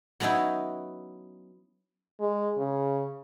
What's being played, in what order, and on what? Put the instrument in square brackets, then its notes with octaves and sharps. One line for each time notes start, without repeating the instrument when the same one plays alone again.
[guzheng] F#3 B3 C#4 D#4 E4
[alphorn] G#3
C#3